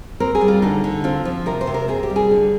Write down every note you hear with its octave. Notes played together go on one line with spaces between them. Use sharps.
C4 A#4
G#4
G3
F4
D3 D#4
D3
C4 F4
F3
C3 A#4
C5
C3
A#4
C4 G#4
G4
G3
G#4
D3